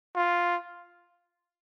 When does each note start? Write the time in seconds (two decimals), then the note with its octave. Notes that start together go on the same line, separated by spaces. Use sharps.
0.16 F4